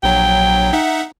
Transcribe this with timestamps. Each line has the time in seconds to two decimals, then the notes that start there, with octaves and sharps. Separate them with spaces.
0.03 A#1 F#3 G5
0.73 D#4 E5 F#5